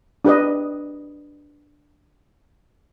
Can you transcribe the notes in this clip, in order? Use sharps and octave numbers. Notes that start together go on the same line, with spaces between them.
D4 G4 B4 D#5